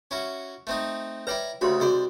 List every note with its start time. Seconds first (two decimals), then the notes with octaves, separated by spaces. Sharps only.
0.11 C#4 E4 F#4
0.67 A3 C4 D#4
1.27 E4 B4 C#5 D5 G5 A#5
1.61 D2 C#3 F#4 G4 B5 C6
1.80 C2 F#4 G#4 C5 D5 D#5